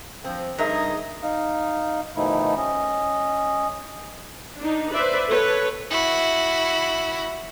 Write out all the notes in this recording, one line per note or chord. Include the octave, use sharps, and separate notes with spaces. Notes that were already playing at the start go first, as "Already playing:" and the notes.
F3 C4
G2 D#4 G#4 A#4 D#5 E5
D#4 F5
B2 D#3 F3 A3 D#4 E4
C#4 D#5
D4 D#4
B4 C5 D5 E5
A4 B4 C#5
E4 F#4